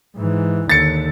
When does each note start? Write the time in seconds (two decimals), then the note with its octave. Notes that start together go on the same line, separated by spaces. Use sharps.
0.16 G#2 E3
0.69 D#2 D3 A6 C#7